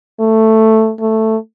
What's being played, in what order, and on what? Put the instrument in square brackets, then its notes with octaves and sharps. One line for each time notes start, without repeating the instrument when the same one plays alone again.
[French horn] A3
A3